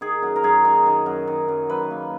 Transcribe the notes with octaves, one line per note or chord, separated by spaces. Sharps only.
D#3 G#4
F#2
A#4
F#2 G#4
D#3
D#3
F#2
D#3
F#2
F#2 B4
A#3